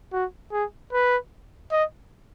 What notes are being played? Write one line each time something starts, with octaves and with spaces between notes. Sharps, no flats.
F#4
G#4
B4
D#5